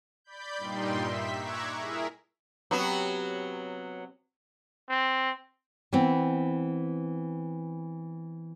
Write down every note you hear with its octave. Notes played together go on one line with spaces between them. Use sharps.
D5 B5 G6
G2 A#2 G3 D#4 G5 C6
E5 B6
A#5 C#6 D6 E6 F#6 G#6
E4 G#4 A#4 E5
C3 F#3 B3 F#4
C4
E3 B3 C4